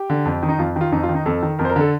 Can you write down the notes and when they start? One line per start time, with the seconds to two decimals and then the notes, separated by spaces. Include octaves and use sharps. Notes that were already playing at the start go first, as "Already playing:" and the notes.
Already playing: G4
0.10 D3
0.25 F2
0.43 D#3
0.49 D#4
0.59 F2 F4
0.76 D#3 F4
0.92 F2 D#4
1.03 F4
1.09 D#3
1.15 D#4
1.26 F2 A4
1.43 D#3
1.59 F2 A#4
1.65 C5
1.70 A#4
1.76 D3 A4